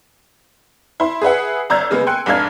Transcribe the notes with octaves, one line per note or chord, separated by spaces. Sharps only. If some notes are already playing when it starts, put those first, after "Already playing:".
E4 C6
G#4 B4 E5 F#5
G1 D5 A#5 E6 G6 G#6
C#3 G#3 A#3 B3
G5 G#5 C6 F#6 C#7
F1 G#2 D4 F5 F6 G#6